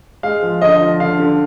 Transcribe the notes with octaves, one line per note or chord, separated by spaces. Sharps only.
G#3 F5
F3
D3 D#5
F3
D3 F5
D3